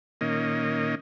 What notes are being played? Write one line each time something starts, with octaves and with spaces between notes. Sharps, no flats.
A#2 D#3 A#3 C#4 D#5